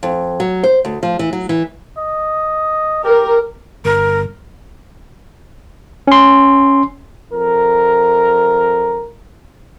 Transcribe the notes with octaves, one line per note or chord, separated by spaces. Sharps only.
F2
F#3
C5
D2
F3
E3
F#3
E3
D#5
G4 A#4
G1 A#4
C#4 C6
F2 A#4